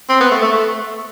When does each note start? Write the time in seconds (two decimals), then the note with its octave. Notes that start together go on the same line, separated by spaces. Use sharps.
0.09 C4
0.20 B3
0.31 A3
0.42 A3
0.53 A3